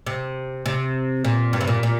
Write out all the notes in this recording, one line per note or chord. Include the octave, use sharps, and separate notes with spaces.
C3
C3
A#2
G2
C3
A#2
A#2